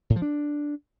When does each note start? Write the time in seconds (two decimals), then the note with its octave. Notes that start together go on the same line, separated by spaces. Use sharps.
0.10 A2
0.16 F3
0.22 D4